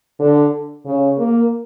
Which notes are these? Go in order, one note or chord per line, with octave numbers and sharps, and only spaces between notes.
D3
C#3
A#3